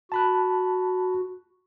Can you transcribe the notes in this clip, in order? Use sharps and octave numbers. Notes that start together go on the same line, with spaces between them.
F#4 A5 B5 F#6